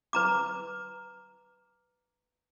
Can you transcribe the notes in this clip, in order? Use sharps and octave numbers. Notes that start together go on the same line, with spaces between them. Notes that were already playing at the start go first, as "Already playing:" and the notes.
B4 A#5 D6